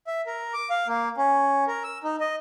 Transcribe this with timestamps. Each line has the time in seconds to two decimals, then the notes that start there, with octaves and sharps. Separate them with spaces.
0.07 E5
0.26 A#4
0.54 D6
0.70 F5
0.87 A#3
1.17 C#4
1.67 A#4
1.84 E6
2.04 D#4
2.20 D#5